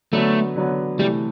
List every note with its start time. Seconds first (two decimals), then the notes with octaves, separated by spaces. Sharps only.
0.12 D3 F#3 A3 B3
0.56 D3 F#3 B3
0.99 C3 E3 G3 A3 E4